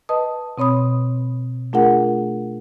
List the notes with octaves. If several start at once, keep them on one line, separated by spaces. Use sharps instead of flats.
B4 D#5 A5 D#6
B2 C4 C#5 B5 D#6
A3 D4 F4 G#4 A#4 F#5